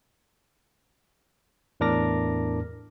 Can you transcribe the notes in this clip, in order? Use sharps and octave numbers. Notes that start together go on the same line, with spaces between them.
E2 A2 D4 A#4 D6 A#6